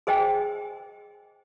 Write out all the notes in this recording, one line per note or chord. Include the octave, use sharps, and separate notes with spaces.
G#4 C5 D#5 G5 G#5